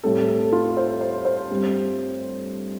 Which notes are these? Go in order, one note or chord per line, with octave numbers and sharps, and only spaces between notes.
A2 G3 C4 A4
A4
F4
C5
C5
C5
G2 G3 C4